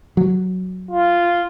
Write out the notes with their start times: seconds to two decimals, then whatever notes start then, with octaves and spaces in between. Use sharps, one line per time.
0.17 F#3
0.91 F4